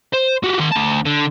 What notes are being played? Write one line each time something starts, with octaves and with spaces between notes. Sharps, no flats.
C5
F#4 G4
D#3 C6
D2 A5
D3